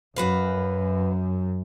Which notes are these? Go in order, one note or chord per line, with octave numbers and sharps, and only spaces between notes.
F#2 F#4 B4 F5